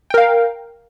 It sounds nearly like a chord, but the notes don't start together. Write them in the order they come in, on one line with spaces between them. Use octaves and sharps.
G5 A#4 F5